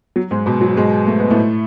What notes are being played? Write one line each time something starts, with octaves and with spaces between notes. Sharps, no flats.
F#3
G#2 G#3
B2 B3
F#3
G#2 G#3
A3
B3
A2 A3